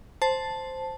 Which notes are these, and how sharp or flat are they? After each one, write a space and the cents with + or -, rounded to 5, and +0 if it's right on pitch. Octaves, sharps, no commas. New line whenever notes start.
C5 +0 A5 +0